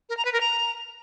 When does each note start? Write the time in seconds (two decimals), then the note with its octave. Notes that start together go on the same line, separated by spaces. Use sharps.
0.09 A#4
0.17 A#5
0.25 B4
0.33 A#4
0.41 A#5